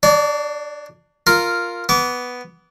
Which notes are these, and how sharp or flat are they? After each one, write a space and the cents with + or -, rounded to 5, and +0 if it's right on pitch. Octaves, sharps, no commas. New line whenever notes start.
D4 +15 D5 -40
F4 +0 A#4 -5
B3 +0 D6 -30